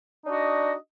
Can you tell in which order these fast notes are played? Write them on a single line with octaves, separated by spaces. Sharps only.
D#4 D4 F#4 D#5